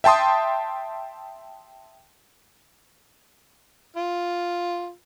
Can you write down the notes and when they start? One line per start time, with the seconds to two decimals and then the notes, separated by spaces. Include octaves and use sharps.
0.04 E5 G5 A5 C6 D#6
3.97 F4